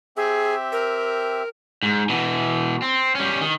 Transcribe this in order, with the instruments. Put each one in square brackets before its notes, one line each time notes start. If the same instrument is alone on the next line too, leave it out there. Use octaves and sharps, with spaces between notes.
[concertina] C4 G4 E5 [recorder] G#4
[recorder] A#4
[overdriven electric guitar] G#2
B2 E3
C4
G3 C#4
D#3